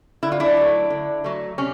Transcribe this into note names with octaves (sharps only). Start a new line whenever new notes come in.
D3 E4
F4
D4 E4
F#3 A3
D3
F#3 A3
C3 C#4